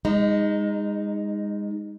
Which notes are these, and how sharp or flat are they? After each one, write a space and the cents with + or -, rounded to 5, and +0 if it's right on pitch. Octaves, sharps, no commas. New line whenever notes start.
G#3 -30 D#4 +0